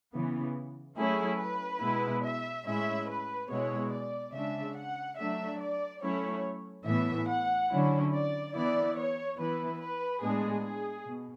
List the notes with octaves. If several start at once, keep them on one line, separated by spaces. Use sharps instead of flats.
C#3 E3 B3
F#3 A3 C#4 E4 G#4
B4
B2 G#3 B3 E4
E5
A2 G#3 C#4 E4 E5
B4
B2 G#3 B3 E4 C#5
D5
C#3 G#3 D4 E5
F#5
F#3 A3 D4 E5
D5
F#3 A3 C#4 E4 C#5
A2 E3 B3 E5
F#5
D3 F#3 C#4 E4
D5
E3 B3 E4 D5
C#5
E3 B3 E4 B4
B4
A2 G#3 B3 D4 G#4
G#4
B2